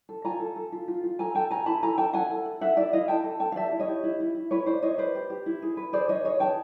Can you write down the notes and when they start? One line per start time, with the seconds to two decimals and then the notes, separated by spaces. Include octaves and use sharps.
0.09 A4
0.25 F4 G#5 A#5
0.40 A4
0.56 A4
0.72 F4
0.88 F4
1.04 F4
1.19 A4 G#5 A#5
1.34 A4 G5 A5
1.51 A4 G#5 A#5
1.66 E4 A5 B5
1.83 A4 G#5 A#5
1.98 A4 G5 A5
2.13 E4 F#5 G#5
2.30 A4
2.46 A4
2.61 A4 E5 F#5
2.77 E4 D5 E5
2.93 E4 D#5 F5
3.08 A4 G5 A5
3.24 A4
3.40 A4 G5 A5
3.52 F5
3.56 G4 D5 E5
3.72 E4
3.80 C#5 D#5
3.88 G4
4.03 E4
4.20 E4
4.35 E4
4.51 E4 B4 C#5
4.66 E4 C5 D5
4.82 E4 C#5 D#5
4.98 B4 C5 D5
5.15 G4
5.30 G4
5.46 E4
5.62 G#4
5.77 B4
5.93 G#4 C5 D5
6.09 B4 C#5 D#5
6.25 G#4 C#5 D#5
6.40 G#4 G5 A5